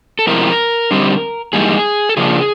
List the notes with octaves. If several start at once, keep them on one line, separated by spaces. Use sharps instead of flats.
A4
C3 F3 G#3 C4 E4 A#4
D3 G3 C4 D#4
G#2 E3 G3 A#3 D#4 G#4
A4
C#3 F3 A#3 D4 G#4